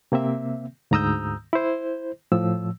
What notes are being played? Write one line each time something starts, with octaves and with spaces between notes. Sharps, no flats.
C3 A#3 C4 E5
D2 G#2 A#5 D#6 E6 G6
E4 C5
A2 F3 E6